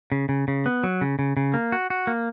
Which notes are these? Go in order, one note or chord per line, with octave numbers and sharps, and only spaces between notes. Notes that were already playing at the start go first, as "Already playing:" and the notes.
C#3
C#3
C#3
B3
F#3
C#3
C#3
C#3
A#3
F#4
F#4
A#3